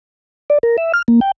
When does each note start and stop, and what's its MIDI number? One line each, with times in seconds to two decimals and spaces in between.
0.50 0.58 74
0.63 0.77 70
0.78 0.92 76
0.94 1.02 89
1.08 1.20 58
1.21 1.31 79